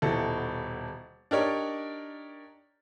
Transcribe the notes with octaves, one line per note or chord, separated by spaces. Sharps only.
D#1 B2 E4 A4
D4 D#4 G4 A#4 C#5 D5